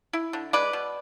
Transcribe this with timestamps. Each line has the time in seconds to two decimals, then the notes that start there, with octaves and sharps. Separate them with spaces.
0.13 E4
0.33 D3
0.53 G#3 B4 D5
0.73 B2